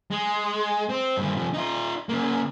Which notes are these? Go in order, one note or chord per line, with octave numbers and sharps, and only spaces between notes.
G#3
C4
G2 D#3
C3 F3
D#4 F4
C#3 A#3